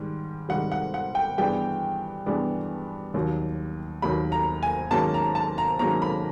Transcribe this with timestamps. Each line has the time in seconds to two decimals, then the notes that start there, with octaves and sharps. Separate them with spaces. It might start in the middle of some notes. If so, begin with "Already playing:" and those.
Already playing: G#2 D#3 G3
0.49 G#2 D#3 G3 F#5
0.72 F#5
0.94 F#5
1.15 G5
1.38 G2 E3 G#3 B3 D4 G5
2.26 G2 E3 G#3 B3 D4
3.14 D#2 D#3 F#3
4.02 D#2 D#3 F#3 B5
4.32 A#5
4.63 G#5
4.91 G#2 D#3 F#3 A#3 C#4 A5
5.14 A#5
5.35 A5
5.58 A#5
5.79 G#2 D#3 F#3 A#3 C#4 A#5
6.02 B5